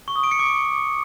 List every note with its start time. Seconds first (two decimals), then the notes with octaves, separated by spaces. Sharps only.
0.08 C#6
0.16 D#6
0.24 D7
0.31 C#7
0.39 D6